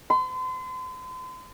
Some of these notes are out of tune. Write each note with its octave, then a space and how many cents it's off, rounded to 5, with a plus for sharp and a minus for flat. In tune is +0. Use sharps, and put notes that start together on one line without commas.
C6 -40